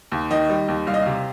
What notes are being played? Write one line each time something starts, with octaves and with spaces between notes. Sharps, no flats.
D#2
D#3 D#5
G3
D#2
C2 F5
D#5
C3 F5